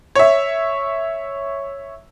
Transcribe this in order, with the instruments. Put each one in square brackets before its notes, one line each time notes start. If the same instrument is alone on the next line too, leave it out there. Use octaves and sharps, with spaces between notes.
[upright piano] C#5 E5